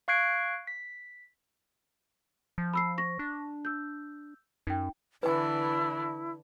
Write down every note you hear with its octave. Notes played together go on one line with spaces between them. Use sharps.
F5 C#6 F#6 G#6 C7 D7
B6
F3
B5 E6 C7
C#6 A#6
D4
E6 G6
F#2 D#4 G5
D3 E3 D4 E4 B4 G#5